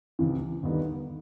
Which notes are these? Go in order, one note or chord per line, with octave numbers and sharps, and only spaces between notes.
C#2 C3 E3
D#2 D3 G3 B3 D#4